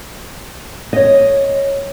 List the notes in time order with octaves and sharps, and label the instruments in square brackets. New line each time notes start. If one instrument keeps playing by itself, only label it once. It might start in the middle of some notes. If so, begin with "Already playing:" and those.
[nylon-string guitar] C#5 D#5